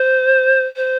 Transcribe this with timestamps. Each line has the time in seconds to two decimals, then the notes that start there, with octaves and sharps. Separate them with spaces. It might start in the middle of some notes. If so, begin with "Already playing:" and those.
Already playing: C5
0.76 C5